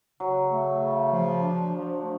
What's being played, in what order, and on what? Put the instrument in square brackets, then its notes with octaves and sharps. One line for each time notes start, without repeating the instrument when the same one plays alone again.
[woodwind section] C#3 [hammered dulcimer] F#3
[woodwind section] A3
C#3
F3
D4
F3
A3